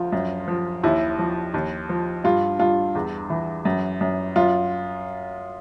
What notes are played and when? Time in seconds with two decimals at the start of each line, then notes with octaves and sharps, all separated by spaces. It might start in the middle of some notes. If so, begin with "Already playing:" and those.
Already playing: D2 F3 F4
0.12 F#2
0.48 F3
0.83 D#2 E4
1.19 F3
1.54 D#2
1.89 F3
2.24 G2 F4
2.59 G2 F4
2.95 E2
3.30 E3
3.65 F#2
4.01 F#2
4.36 F#2 F4